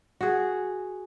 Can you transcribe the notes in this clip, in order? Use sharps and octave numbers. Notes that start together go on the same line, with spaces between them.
F#4 G#4